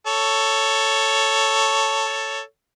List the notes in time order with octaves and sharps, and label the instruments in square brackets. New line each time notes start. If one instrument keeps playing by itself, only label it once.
[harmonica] A4 C#5